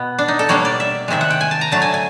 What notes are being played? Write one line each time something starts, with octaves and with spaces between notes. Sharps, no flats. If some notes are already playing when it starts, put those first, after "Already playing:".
Already playing: B2 B3
D4
D#4
A4
B2 G3 A#3 D4 C#5
D5
E5
C3 D#3 G#3 C4 E5
F#5
G5
G#5
A5
A#5
D3 F#3 A3 A5
G#5
G#5